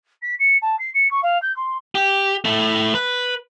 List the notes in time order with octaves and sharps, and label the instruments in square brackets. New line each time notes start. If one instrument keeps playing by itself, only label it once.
[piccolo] B6
C#7
A5
C7
C#7
C#6
F5
G6
C6
[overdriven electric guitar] G4
A3 E4
B4